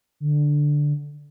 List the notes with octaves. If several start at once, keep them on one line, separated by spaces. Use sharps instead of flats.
D3